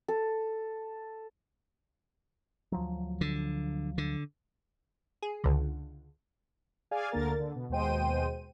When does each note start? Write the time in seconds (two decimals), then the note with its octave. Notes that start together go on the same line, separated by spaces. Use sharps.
0.08 A4
2.72 D2 F3 F#3
3.21 D3
3.98 D3
5.22 G#4
5.44 C#2 D3
6.91 G#4 D5 F5 G#5
7.11 D2 D3 A#3 A#4 A6
7.40 D3
7.56 B2
7.69 D#2 B2 G#3 C5 G5 D#7